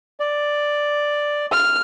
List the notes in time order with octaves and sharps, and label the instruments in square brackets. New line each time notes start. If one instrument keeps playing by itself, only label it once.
[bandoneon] D5
[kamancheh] F6